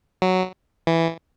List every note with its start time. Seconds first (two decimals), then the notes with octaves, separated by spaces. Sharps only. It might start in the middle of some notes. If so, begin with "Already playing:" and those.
0.22 F#3
0.87 E3